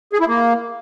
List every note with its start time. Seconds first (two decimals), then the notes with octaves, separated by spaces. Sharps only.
0.13 G#4
0.20 E4
0.28 A#3